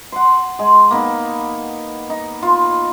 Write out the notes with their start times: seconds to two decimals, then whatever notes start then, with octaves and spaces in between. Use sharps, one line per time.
0.12 F#5 C6
0.59 G#3
0.91 A#3 B3 D#4
2.10 D#4
2.42 F4